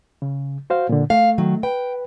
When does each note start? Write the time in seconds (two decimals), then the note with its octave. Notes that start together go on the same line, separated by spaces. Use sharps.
0.22 C#3
0.70 F#4 C5 F5
0.89 A#2 D3
1.10 A3 F5
1.38 D#3 F#3
1.63 B4 G5